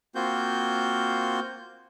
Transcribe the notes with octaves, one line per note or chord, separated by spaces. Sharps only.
A#3 C4 F4 F#4 G6